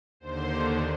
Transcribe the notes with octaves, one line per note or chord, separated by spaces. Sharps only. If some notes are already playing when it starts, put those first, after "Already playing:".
D#2 D3 C5